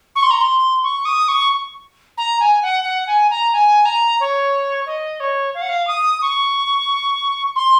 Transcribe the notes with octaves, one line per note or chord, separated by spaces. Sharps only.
C#6
C6
A#5
C6
C#6
D#6
C#6
A#5
G#5
F#5
F#5
G#5
A#5
G#5
A#5
C#5
D#5
C#5
F5
F#5
F5
D#6
C#6
C6